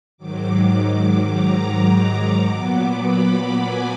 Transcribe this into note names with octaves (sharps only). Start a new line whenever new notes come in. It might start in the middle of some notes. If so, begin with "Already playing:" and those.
G#2 D#3 F#3 D6
D6
A#5
D6
A#2 F#3 B3 D6
B5
G#5